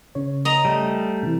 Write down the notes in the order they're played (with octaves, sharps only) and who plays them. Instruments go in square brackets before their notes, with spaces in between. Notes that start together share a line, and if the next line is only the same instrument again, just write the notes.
[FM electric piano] C#3 C#5
[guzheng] D#5 A#5
[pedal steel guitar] G3 A3
[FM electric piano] C3 E3